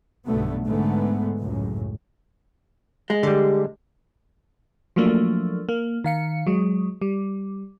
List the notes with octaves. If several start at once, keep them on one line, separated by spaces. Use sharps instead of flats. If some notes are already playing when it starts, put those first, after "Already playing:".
B1 G2 B2 D3 A3 B3
G#2 D3 G#3 A3 B3
C#2 F#2 A2
G#3
D3 G3 G4
F3 F#3 A3 A#3 D4
A#3
D#3 F5 C#7
F#3 G#3
G3